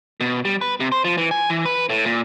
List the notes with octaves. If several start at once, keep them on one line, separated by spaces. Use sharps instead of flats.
B2
G3
B4
C3
C5
F3
E3
G#5
E3
B4
A2
A#2